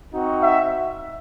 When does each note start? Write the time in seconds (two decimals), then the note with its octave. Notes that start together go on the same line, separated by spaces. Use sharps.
0.13 C4 D#4 F#4
0.43 E5